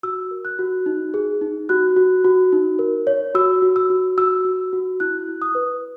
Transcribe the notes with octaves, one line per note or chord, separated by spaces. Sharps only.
F#4 E6
A#4
F#6
F#4
D#4
G#4
D#4
F#4 F#6
F#4
F#4
D#4
A#4
C#5
F#4 E6
F#4
E6
F#4
F#4 E6
F#4
F#4
E4 F#6
E4
D#6
B4